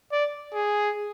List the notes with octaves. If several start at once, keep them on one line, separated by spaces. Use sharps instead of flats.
D5
G#4